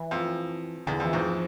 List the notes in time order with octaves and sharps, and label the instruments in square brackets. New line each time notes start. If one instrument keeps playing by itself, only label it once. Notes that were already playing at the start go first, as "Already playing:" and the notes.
Already playing: [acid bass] E3
[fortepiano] F2
[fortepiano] E2 [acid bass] D3
[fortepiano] F2
[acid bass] E3
[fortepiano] E2 G#2
[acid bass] F3